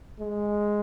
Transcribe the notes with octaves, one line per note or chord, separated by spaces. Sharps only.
G#3